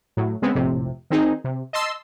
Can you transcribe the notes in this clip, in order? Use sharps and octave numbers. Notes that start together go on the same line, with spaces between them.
A2 F#3
C#3 G#3 B3 C4
A#1 F2 A2 C3
D#3 C4 D#4 G#4
C3
D#5 A5 C6 E6